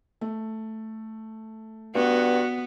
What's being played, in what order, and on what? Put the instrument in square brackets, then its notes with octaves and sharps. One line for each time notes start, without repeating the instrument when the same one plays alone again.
[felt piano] A3
[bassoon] G2 [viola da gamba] B3 [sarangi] F#4